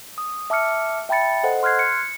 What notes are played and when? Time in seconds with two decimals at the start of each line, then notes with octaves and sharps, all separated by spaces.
0.18 D#6
0.50 E5 A5 D6 E6 F6 C#7
1.09 E5 G5 A5 B5 A6 C#7
1.43 A4 C5 D#5 F#5
1.63 C6 F6 F#6 G#6 C7
1.79 C#7